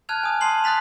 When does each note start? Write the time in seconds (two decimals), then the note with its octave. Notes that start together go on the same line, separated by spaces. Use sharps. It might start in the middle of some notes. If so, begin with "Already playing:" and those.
0.09 A5 F6 F#6 G#6 F7
0.23 G#5 D#6
0.41 A5 C6 C7 F#7
0.64 D#6 F#6 A6 B6 F7